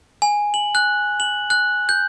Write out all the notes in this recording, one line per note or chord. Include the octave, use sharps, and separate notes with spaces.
G#5
F#7
F#6
F#7
F#6
G6